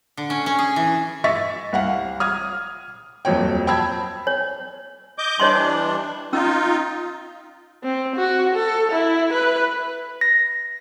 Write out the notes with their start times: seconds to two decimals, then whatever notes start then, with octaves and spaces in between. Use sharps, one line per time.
0.17 D3
0.30 C#4
0.46 C#4
0.59 G#4
0.76 E3
1.24 D#5 E5 C#6 A6 B6
1.73 C2 F5 F#5
2.20 D#6 F6 G#6
3.25 D#1 F2 F#3 C#5 G5
3.67 G5 A5 B5 E6 G#6
4.27 C#5
5.18 D#5 D6 G6
5.40 E3 G3 D4 C#5 D#5 C6
6.33 C#4 D#4 F4 E6
7.83 C4
8.16 F#4
8.55 A4
8.92 E4
9.33 B4
10.21 A#6